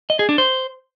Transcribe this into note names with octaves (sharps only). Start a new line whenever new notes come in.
D#5
G#4
D4
C5